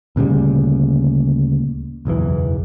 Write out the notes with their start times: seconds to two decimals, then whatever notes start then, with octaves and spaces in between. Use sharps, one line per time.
0.16 D2 A#2 C#3 G3
2.05 F#1 B1 E2 E3